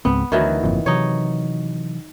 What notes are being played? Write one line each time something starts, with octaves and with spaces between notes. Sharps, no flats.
C#2 G#2 B3 C4
D2 D#3 E3 F#3
G1 F2 A#2
C3 E3 F#3 D#4 C#5